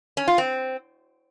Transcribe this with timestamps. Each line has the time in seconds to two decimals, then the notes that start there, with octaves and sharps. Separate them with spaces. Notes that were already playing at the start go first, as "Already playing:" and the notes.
0.17 C#4
0.28 F4
0.38 C4